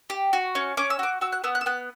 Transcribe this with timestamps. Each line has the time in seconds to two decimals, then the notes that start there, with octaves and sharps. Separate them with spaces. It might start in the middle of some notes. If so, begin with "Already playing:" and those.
0.10 G4
0.33 F#4
0.55 C#4
0.77 C#4 D6
0.90 E6
0.99 F#4 D6
1.21 F#4 E6
1.32 F#6
1.44 B3 E6
1.55 F#6
1.61 E6
1.66 B3 F#6